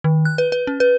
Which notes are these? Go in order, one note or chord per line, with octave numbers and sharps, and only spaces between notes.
D#3
F#6
B4
B4
C#4
B4